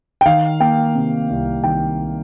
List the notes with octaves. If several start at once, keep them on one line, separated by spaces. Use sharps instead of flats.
G5
D#3 F5
A#3 G5
C3
C2
D#3 G5